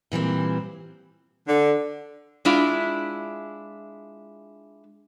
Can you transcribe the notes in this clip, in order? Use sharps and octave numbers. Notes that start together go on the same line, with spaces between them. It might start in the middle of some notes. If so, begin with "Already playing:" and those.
A#2 E3 G3 C4
D3
G#3 D4 E4 F4